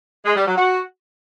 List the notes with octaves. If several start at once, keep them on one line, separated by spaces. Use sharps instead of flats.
G#3
G3
F#3
F#4